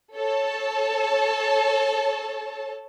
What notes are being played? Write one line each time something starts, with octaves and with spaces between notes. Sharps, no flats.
A4 C#5 A5